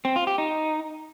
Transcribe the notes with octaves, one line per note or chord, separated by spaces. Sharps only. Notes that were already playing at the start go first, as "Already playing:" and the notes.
C4
F4
G4
D#4